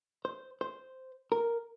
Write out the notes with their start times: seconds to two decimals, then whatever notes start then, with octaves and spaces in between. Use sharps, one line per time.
0.25 C5
0.61 C5
1.32 A#4